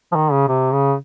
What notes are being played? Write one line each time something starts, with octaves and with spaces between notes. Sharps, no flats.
F3
D#3
C#3
C3
C#3